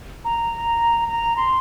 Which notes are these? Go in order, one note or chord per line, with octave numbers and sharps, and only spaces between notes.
A#5
A#5
C6